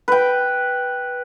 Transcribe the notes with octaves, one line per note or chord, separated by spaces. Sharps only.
B4 G5